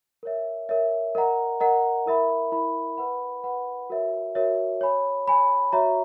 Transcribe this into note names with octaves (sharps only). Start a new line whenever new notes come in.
A#4 C#5 E5
A#4 C#5 E5
A#4 D#5 F#5 A#5
A#4 D#5 F#5 A#5
E4 A#4 E5 B5
E4 A#4 E5 B5
B4 F#5 B5
B4 F#5 B5
F#4 A#4 C#5 E5
F#4 A#4 C#5 E5
C#5 G#5 B5
C#5 G#5 B5
F#4 C#5 E5 A#5 C#6